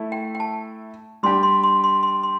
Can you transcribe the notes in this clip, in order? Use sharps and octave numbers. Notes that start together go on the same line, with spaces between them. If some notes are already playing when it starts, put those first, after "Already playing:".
Already playing: A3 E4
G5
G5
A5
G3 D4 G4 C6
C6
C6
C6
C6
C6